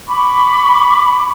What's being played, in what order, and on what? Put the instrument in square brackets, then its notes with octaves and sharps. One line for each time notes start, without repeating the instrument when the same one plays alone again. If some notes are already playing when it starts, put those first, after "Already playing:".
[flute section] B5 C#6 D6